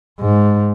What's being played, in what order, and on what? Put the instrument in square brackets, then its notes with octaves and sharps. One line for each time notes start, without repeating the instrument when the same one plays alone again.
[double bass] G#2